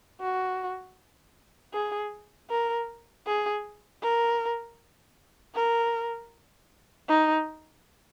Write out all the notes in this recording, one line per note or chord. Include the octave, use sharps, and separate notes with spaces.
F#4
G#4
A#4
G#4
A#4
A#4
D#4